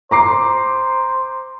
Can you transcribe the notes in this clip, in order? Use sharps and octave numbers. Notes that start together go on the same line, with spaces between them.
C5 A#5 D6 C7